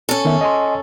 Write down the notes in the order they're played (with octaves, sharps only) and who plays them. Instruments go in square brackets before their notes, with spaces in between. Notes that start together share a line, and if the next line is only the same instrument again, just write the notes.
[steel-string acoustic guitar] C#4 A4
[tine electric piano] D#3 B3 E5
D#5 G#5 C6